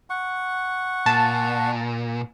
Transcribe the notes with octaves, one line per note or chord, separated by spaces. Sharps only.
F#5 C#6
A#2 A5